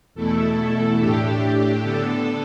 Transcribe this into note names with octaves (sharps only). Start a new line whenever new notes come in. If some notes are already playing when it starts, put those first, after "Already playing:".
E2 B2 A3 E4 A4
A2 A3 D4 G4
D3 B3 D4 A4